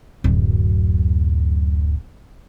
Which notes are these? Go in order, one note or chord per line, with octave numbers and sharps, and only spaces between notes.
D1 F#2